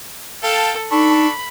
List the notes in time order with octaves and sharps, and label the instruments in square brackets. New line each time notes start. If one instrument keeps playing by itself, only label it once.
[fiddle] A4 [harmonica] F5 G5 A5
[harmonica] D4 A4 C#6 [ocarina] D#4 [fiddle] B5